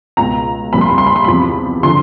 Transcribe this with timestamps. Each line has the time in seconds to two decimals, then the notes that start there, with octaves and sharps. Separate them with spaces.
0.17 C#2 B2 A#5
0.73 C2 A#2 F3 B5
0.81 C6
0.90 B5
0.98 C6
1.07 B5
1.16 C6
1.24 E2 C3 F3 B5
1.83 D3 F3 C6